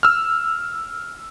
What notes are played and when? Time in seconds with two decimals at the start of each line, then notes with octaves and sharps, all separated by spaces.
0.03 E6 F6